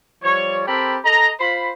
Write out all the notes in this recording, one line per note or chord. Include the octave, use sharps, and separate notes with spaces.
F3 G3 C#5
C4 G4 A4 A#4 B5
A4 D#5 A#5
F4 C5 B5